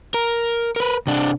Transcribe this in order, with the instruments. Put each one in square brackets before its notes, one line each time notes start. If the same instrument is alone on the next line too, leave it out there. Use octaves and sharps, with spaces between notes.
[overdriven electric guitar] A#4
A#4 B4
C3 D4